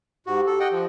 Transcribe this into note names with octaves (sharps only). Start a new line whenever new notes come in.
G#2 F#4 G4
A4
D#5 F#5 G5
F3